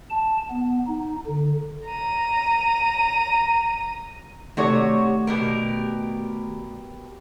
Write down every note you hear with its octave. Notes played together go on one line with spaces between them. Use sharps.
A5
B3
D#4
D3
A#5 D#7
C3 D#3 A3 F#4 C#5 D5
B2 G4 A#4